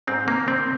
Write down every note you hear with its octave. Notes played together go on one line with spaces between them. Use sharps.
G#2 G#3 C4
A#3
C4